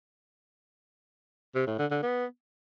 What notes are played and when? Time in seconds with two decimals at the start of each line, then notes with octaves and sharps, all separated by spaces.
1.55 C3
1.67 A2
1.79 D3
1.91 D3
2.03 B3